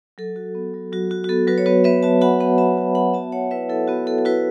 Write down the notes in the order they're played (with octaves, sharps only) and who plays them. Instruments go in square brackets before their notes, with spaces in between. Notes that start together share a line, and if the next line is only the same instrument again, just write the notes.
[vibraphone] F#3 A4
F#4
B3
F#3
F#3 F#4
F#4
F#4
B3 A4
F#3 F#4 B4
C#5
B3 F#4 B4
B3 B4 E5
F#4 E5 A5
F#4 F#5 B5
B3 F#5 B5
B3 E5 A5
F#4
F#4 F#5 B5
B3 E5 A5
B3 C#5 F#5
E4 B4 E5
E4 A4
B3 F#4
B3 A4
A4
E4 F#4 B4